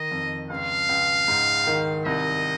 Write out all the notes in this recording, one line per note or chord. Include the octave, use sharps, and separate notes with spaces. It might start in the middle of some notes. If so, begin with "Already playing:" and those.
Already playing: D#3 D#5
F2
C#2 F5
C#2
G#2
D#3
C2 D#5